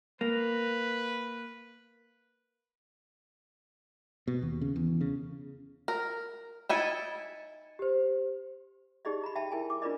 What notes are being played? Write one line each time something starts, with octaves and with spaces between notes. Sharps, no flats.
A#3 B4
B2
D#2
C#3
E2
C#3
A#4
D#4 E4 G#5 A6 C#7 E7
G4 C5
D#4 G4 G#4 D5 D#5
A#5 B5
E5 G5 A5 B5
E4 A#4 G5 G#5
D6
D4 F4 A#4 B4 D5 D#5